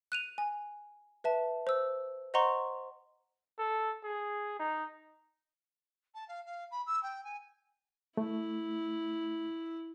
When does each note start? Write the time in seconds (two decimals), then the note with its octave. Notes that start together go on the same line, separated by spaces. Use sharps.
0.12 F#6 D#7 F7
0.38 G#5
1.24 B4 E5 A5
1.67 C5 E6
2.34 C5 D#5 F#5 A#5 C6 C#6
3.59 A4
4.04 G#4
4.59 D#4
6.15 A5
6.28 F5
6.46 F5
6.71 B5
6.87 E6
7.03 G5
7.24 G#5
8.17 A3 E4